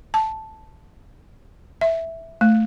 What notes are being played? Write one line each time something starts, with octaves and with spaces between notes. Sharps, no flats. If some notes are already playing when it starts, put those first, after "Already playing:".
A5
E5
A3